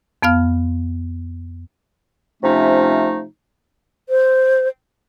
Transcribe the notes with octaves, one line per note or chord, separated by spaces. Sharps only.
F2 B3 F5 F6
C3 F3 A3 C#4 D#4
C5